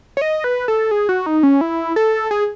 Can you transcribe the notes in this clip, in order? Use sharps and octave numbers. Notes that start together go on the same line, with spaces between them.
C#5
D#5
B4
A4
G#4
F#4
D#4
C#4
E4
A4
G#4